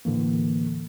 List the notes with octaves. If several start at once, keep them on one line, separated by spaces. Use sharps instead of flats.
A2 D3 E3 A#3